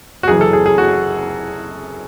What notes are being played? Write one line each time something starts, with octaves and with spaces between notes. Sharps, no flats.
F#4
F#1 F#2 E3 G#4
A4
G#4
G#4
F#4